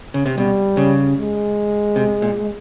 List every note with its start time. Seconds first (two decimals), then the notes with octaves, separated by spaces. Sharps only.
0.14 C#3
0.26 C3
0.37 B2 G3
0.77 C#3
1.17 G#3
1.96 C3
2.22 A#2